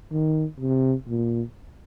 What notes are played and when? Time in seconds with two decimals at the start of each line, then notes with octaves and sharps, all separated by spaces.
0.12 D#3
0.60 C3
1.08 A#2